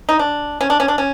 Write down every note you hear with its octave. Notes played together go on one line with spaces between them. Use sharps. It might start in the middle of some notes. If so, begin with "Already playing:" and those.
D#4
D4
C#4
D4
C#4
D4
C#4